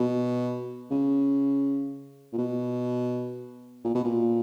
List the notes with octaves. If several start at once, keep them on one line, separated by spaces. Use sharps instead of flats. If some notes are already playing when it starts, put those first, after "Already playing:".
Already playing: B2
C#3
A#2
B2
A#2
B2
A#2